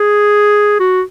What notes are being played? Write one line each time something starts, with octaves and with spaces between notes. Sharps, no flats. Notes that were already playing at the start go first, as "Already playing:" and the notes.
Already playing: G#4
F#4